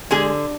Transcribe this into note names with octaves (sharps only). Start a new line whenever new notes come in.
D3 G#3 G#4